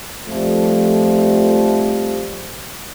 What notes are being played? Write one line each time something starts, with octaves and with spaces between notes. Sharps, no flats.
F2 F3 G3 A3